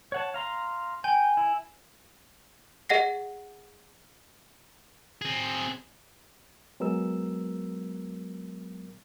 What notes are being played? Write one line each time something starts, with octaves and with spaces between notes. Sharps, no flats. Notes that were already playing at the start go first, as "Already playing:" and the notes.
C#5 F#5 A5
F5 A#5 C6
G5 G#5
E4
G#4 D#5 F#5 A#6 C7
C4 G#4
F#3 G#3 B3 A#4 E6